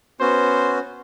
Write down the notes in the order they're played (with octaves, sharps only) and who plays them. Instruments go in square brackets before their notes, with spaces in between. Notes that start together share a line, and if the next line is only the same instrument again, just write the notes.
[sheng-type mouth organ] B3 C#4 F#4 [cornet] C5